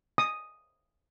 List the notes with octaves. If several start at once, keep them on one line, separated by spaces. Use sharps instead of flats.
D#6